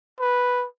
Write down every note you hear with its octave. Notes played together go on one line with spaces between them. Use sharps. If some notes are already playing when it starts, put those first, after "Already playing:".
B4